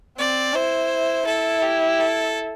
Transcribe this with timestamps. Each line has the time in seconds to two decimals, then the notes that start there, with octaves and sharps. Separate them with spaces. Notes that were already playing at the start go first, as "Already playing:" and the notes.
0.18 C4 D5
0.54 E4 C5
1.26 E4 A4
1.63 G4
2.00 A4